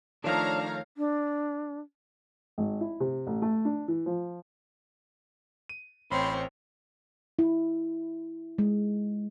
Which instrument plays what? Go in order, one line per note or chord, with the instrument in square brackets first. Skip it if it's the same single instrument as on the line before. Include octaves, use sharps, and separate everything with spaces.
[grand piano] D#3 F3 A3 [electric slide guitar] D4 [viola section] C#5 F5 A#5
[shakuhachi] D4
[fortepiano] G#1
E4
C3
A1
A3
D4
E3
F3
[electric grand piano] D#7
[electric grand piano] A1 C5 [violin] C4 [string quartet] A#4 C#5 [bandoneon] B5 C6
[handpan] E4
G#3